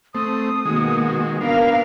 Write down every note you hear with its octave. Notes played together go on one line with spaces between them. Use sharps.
A3 C4 D#6
B2 D#3 G#3 A#3 F#4
B3 D4 A#4 F5